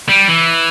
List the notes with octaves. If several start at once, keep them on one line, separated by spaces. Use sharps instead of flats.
G3
E3